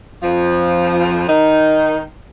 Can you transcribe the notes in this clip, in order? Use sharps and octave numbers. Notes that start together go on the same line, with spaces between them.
F2 F3
D#3 D#4